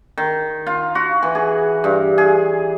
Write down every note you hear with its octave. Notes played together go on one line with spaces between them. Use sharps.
D#3
F4
F#4
E3
G#4
G2
G#4